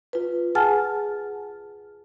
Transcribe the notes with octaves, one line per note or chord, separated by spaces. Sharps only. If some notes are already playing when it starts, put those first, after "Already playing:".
F4 B4
G#4 F#5 G#5 A5 F6 A6